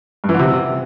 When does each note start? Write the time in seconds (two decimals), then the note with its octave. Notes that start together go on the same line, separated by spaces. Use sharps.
0.24 G2
0.29 E3
0.34 D3
0.39 C3